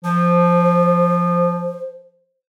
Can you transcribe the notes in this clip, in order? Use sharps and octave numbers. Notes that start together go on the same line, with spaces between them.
F3 C5